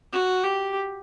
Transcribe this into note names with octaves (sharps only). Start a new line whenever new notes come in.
F#4
G4